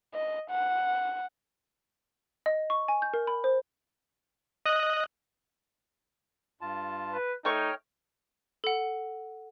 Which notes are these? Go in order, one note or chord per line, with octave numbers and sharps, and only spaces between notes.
D#5
F#5
D#5
C#6
G#5
G6
A#4
B5
C5
D#5 D#6 F#6
G2 F4 A5
B4
A3 D#4 C#5 G5 C#6 F6
A4 F#5